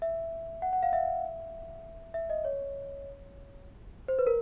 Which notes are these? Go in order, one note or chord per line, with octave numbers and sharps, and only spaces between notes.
E5
F#5
F#5
F5
E5
E5
D#5
C#5
C5
B4
A#4